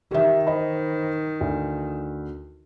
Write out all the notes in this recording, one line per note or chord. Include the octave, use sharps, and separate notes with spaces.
D#3 G4 E5
C5 D#5 B5
D2